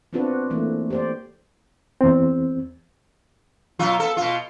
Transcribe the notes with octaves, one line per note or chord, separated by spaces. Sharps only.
B3 C4 D4 F4 F#4 B4
E3 A3 A#3
G4 C5 D5
E2 C4
B2 F#3 F4
B3 A4
B2 F4